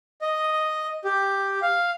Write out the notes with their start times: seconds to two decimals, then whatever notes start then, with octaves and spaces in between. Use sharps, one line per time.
0.21 D#5
1.04 G4
1.62 F5